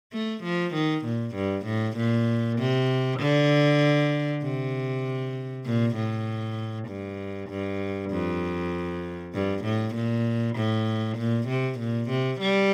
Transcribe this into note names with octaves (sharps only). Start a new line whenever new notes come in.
A3
F3
D#3
A#2
G2
A2
A#2
C3
D3
C3
A#2
A2
G2
G2
F2
G2
A2
A#2
A2
A#2
C3
A#2
C3
G3